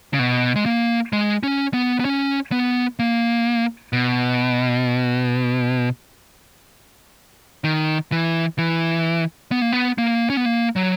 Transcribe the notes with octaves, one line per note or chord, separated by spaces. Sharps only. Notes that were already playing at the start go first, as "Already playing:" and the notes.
C#3
B2
G#3
A#3
G#3
C#4
B3
B3
C#4
B3
A#3
B2
D#3
E3
E3
B3
A#3
B3
A#3
C#4
B3
A#3
F#3